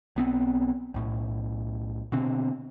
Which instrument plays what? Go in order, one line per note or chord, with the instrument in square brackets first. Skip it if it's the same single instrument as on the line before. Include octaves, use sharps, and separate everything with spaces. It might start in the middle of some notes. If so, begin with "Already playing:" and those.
[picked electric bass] B1 B3 C4
B1 A2
B2 D3 C4